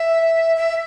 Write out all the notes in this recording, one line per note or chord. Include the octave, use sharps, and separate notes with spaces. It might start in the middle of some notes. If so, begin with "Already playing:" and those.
Already playing: E5
E5